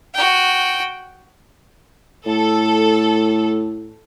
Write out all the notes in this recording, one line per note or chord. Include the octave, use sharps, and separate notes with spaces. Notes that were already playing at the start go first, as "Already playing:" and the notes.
F#4 G5
A2 A4